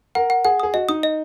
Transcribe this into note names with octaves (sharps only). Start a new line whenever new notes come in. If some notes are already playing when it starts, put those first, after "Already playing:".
A#4 F#5
F#5
G#4 F#5
G#4 D#6
F#4 D#5
D#4 D#6
D#5